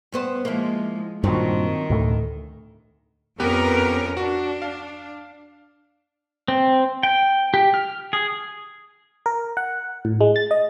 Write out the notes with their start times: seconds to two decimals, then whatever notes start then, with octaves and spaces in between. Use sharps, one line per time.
0.12 G2 B3 C5
0.45 F3 G#3 A#3 E4
1.24 G2 A#2 D#3 F#3 C4
1.90 D2 A2 A3
3.40 F2 B3 C#4 G4 A#4 B4
4.17 D4 F#4
4.62 F5
6.48 C4
7.03 G5
7.54 G4
7.74 F6
8.13 G#4
9.26 A#4
9.57 F#5
10.05 A2
10.21 G#3
10.36 A6
10.51 D#5